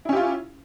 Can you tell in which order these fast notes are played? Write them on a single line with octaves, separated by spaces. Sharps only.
E4 C#4 G4 F4